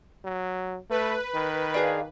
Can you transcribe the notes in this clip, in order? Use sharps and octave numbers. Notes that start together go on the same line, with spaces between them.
F#3
A3 B4
D#3
D4 G#4 F5